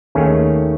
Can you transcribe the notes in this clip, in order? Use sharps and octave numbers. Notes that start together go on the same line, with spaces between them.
D#2 D#3 A3 C#4 G#4